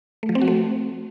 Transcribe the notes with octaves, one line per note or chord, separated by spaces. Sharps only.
A3
F3
C4
F#4
A3